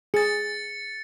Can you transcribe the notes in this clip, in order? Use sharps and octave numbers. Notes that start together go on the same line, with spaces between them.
G#4 A6 C#7